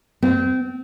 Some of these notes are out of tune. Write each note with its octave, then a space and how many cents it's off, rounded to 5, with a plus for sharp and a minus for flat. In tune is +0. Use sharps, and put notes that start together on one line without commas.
C4 -25